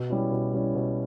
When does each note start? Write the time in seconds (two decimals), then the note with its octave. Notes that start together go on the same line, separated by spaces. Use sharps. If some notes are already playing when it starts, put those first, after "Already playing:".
Already playing: B2
0.10 G3 C#4 E4
0.31 B2
0.53 G3 C#4 E4
0.74 B2